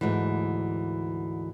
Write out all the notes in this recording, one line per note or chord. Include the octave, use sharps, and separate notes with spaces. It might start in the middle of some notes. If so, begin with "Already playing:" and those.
D2 G#2 E3